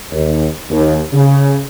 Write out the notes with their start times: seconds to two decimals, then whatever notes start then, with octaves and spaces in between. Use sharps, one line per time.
0.12 D#2
0.70 D#2
1.13 C#3